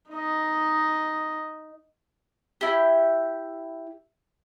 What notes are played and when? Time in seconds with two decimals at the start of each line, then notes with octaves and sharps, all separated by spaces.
0.10 D#4 D#5
2.61 E4 G4